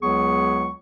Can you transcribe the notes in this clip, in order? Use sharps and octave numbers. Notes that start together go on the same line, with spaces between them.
C#2 F#3 B3 G#4 C#6